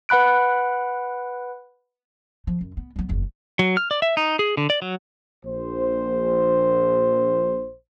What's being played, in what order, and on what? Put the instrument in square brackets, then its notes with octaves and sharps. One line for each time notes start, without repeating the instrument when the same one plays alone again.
[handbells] B4 F#5 B5 F#6 D7
[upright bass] F3
F#2
B3
F#3 B3
F#1 E2
[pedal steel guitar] F#3
F6
D5
E5
D#4
G#4
D3
D5
F#3
[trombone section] A#1 C5